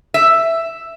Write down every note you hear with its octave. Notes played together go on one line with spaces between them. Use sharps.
E5